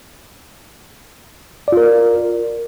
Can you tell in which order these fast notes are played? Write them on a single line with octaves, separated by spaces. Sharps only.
D5 F4 A#4